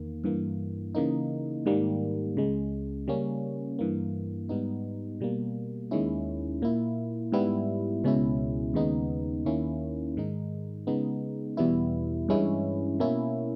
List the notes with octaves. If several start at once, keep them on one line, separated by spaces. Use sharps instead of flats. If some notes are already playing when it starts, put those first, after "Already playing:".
Already playing: E2 D#3 A#3
G2 E3 A#3
C#3 E3 A#3 D#4
G#2 D#3 G3 A#3
C#2 C#3 G#3
C#3 G3 A#3 C#4
G2 E3 A#3
G#2 G3 B3 D#4
B2 G3 A#3
D#2 D#3 G#3 C#4 E4
A#2 A#3 E4
G#2 G3 B3 E4
C#2 B2 G#3 C#4 E4
D#2 C#3 G#3 B3 D#4
D#2 D#3 A#3 C#4 E4
G#2 D#3 G#3 D#4
C#3 G#3 B3 D#4
E2 B2 G3 B3 E4
G2 E3 G#3 C#4 E4
B2 A#3 C#4 E4